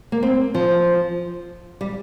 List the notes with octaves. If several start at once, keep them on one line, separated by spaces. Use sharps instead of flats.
A#3
C4
F3
G3